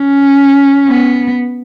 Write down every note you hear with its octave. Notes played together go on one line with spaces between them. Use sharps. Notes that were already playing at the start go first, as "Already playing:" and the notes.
Already playing: C#4
B3